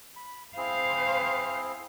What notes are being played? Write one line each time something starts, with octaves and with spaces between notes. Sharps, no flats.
B5
C4 E4 G#4 C5 F5